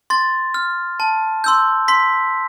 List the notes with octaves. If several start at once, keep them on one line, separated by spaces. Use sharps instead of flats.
C6 A6
F6
A5
C6 E6 G6
C6 B6